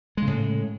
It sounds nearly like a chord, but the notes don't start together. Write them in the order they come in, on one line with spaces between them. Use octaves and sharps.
G#3 C#3 A2